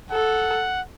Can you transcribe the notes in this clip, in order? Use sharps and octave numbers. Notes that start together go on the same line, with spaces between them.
A4 F#5